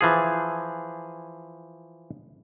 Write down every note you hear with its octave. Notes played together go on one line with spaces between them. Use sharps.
E3 F3 G#4